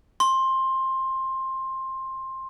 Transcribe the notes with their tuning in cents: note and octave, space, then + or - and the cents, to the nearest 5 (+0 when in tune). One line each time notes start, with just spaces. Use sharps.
C6 +15